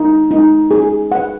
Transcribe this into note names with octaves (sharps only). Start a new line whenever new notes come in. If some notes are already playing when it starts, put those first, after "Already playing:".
Already playing: D#4
D#4
G#4
F#5